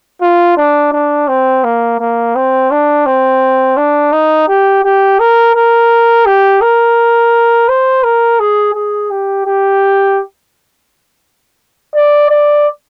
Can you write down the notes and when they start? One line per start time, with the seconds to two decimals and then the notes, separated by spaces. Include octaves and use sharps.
0.22 F4
0.57 D4
0.93 D4
1.28 C4
1.64 A#3
2.00 A#3
2.35 C4
2.71 D4
3.06 C4
3.77 D4
4.12 D#4
4.48 G4
4.84 G4
5.20 A#4
5.55 A#4
6.26 G4
6.62 A#4
7.68 C5
8.03 A#4
8.40 G#4
8.74 G#4
9.10 G4
9.46 G4
11.96 D5
12.31 D5